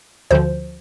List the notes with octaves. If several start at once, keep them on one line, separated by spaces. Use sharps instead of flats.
D2 D3 F3 C5